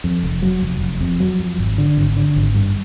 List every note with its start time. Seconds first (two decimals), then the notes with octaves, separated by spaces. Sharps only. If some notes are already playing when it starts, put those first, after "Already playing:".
0.04 F2
0.24 F1
0.42 F#3
0.62 F1
0.81 F1
1.01 F2
1.20 F#3
1.39 F2
1.58 G#1
1.78 D3
1.97 G#1
2.16 D3
2.36 G#1
2.54 G2